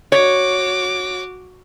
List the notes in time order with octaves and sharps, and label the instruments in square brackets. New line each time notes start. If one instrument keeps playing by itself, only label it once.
[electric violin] F#4 D6 [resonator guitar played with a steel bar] C#5